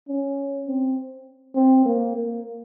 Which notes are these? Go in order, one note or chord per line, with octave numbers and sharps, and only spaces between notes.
C#4
C4
C4
A#3
A#3